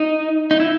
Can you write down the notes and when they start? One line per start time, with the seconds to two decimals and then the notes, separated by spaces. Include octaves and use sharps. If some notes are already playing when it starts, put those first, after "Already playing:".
Already playing: D#4
0.51 D#4
0.60 E4